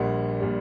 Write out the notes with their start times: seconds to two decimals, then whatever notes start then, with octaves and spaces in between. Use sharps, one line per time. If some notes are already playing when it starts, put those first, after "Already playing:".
Already playing: A#1 A#2 G3 F#5
0.40 A#2 G3